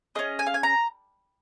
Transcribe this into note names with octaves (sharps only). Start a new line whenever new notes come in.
C#4 F4 G#4 D#5
G#5
F5
G#5
A#5